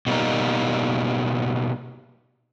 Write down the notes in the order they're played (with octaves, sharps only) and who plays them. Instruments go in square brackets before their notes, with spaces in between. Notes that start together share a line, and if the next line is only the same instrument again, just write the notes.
[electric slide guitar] B2 G3 A#3 D#4